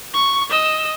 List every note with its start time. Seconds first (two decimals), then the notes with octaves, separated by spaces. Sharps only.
0.14 C#6
0.49 D#5 E6